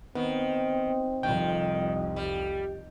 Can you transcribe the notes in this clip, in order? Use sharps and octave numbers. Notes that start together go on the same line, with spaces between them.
D#3 B3 C4
C2 F2 D#3 G5
G3 G4